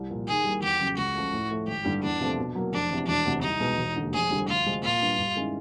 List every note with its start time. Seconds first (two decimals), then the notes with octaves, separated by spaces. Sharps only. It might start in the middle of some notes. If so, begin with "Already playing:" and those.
Already playing: C2
0.10 A#2 F3 A#3
0.27 D#3 G#4
0.44 G3 A#3
0.62 E2 G4
0.80 C#3 F#3
0.97 C#2 F#4
1.15 C#3 F3 A3
1.33 A2
1.51 F3 A3
1.67 G#1 G4
1.85 G2 D3 G3
2.03 E2 D4
2.21 C3 F3 A3 C4
2.38 B2
2.55 F#3 A#3
2.73 F1 D4
2.90 E2 C3
3.07 E1 D4
3.25 D2 C3
3.42 C2 D#4
3.60 B2 G#3 B3
3.78 E1
3.96 D#2 D3
4.13 F1 G#4
4.31 F2 D3 G3
4.48 D2 F4
4.66 C3 F3 G#3 C4
4.83 A#2 F4
5.01 G3 B3 D4
5.18 G2
5.35 D#3 G#3 C#4 E4